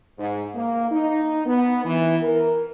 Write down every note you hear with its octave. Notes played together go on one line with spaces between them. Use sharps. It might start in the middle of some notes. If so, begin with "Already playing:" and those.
G#2
A#3
D#4
B3
E3
A#4